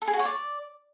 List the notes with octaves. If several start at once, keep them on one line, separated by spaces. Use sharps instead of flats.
A4
G#4
F#4
C#5
D5